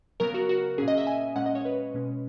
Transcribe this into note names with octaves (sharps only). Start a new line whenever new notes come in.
C#3 F#3 B3 A#4
F#4
F#4
A#2 F#3 C#4 G#4
D#5
E5
G#5
A#2 G#3 C#4 F#5
D#5
C#5
B4
B2 G#3 C#4